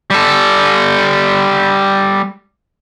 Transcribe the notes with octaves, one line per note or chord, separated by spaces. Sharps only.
G3 A4